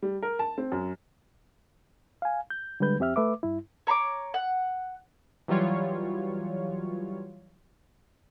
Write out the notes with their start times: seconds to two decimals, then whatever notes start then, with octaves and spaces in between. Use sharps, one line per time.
0.02 G3
0.22 A#4
0.39 A5
0.58 C4
0.72 F#2
2.22 F5 G#5
2.50 G6
2.80 D3 G3 G#3 B4 G6
2.99 F2 C4 G4 E5 F6
3.16 A3 B4 E5 D6
3.43 G2 E4
3.87 C#5 A#5 C6 D6
4.34 F#5
5.48 E3 F#3 G3 F4 C#5